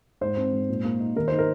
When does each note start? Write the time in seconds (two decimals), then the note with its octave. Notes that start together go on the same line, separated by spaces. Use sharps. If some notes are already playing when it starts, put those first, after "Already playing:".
0.21 G#2 C5
0.37 C4
0.53 G#2
0.69 A#2
0.84 A#3
1.00 D#4
1.16 D#3 A#4
1.28 D#4 C5
1.39 A#4